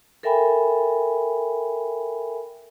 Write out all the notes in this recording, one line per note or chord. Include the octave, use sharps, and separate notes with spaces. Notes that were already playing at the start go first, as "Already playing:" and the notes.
A4 A#4 E5 G5 G#5 B5